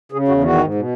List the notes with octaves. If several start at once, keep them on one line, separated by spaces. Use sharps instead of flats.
C#3 G#4
E2 F#4
D#3 F#4
G#2
B2